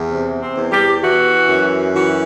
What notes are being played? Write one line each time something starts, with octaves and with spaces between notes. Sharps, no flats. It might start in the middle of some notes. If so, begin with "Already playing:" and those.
Already playing: E2
C3
C4
E2
G4
E3 F#4
F#2
E3 F#4